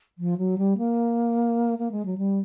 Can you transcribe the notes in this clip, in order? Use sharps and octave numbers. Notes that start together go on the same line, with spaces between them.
F3
F#3
G3
A#3
A#3
G#3
F#3
G3